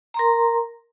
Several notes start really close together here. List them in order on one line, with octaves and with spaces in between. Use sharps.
A#5 C6 A#4